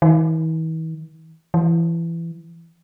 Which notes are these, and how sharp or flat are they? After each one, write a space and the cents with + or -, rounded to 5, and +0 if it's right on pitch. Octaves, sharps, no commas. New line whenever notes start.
E3 -45
E3 +20